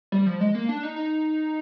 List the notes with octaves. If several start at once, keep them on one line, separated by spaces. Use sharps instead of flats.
G3
F3
G#3
A#3
D4
D#4
D#4